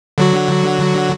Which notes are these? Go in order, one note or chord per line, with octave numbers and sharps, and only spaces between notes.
D3 F#3 F#4